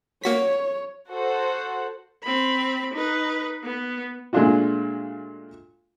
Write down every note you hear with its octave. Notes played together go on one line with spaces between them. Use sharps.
A#3 F#4 C#5 B6
F#4 A4 C5 F#5
C4 B5
D#4 B4
B3
A#2 G#3 A3 D4 F4 F#4